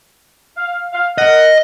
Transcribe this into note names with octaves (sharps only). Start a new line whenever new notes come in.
F5
F5
A#4 D#5 F#5